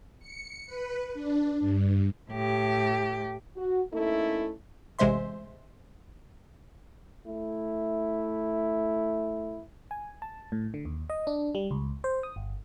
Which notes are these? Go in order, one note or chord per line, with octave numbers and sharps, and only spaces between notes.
C#7
B4
D4
G2
A2 G4
F#4
A3 A#3 C#4 D#4 E4 A4
A1 C3 G#3 C5 E5 C6
A3 E4
G#5
A5
A2
D3
D#2
D#5
D4
G3
C#2
C5
D#6
G1